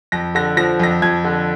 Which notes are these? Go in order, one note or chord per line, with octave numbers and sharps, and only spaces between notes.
F2 A#6
D3 A#6
F3 A#6
F2 A#6
F2 G#6
D3